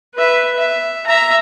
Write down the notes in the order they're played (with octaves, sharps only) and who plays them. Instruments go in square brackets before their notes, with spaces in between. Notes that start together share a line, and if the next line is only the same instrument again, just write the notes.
[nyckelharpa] B4 E5
E5
E5 A#5